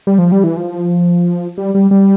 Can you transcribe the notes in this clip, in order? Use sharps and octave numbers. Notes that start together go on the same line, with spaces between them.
G3
F3
G3
E3
F3
G3
G3
G3